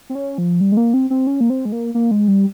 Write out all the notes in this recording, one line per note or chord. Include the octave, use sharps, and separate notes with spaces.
C4
C#4
F3
G3
G#3
A#3
C4
C4
C#4
A#3
C4
G#3
A#3
A#3
G#3
G3